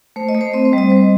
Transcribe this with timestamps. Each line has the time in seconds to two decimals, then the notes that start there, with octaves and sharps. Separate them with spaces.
0.16 A3 C5
0.29 D#5
0.35 A3
0.41 C5
0.53 C4 D#5
0.65 C5
0.73 G3 D#5
0.90 G3 C5